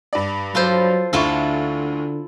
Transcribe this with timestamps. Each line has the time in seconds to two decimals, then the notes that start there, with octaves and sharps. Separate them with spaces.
0.13 G2 D5
0.55 F#3 F4 A4 C5
1.13 D2 D3 E4 F4 A4 C#6